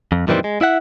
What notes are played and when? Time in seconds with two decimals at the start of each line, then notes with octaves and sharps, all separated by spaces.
0.12 F2
0.27 F#2 A#2 D#3 E3 G3 C4
0.44 G#3
0.61 E4 E5 F#5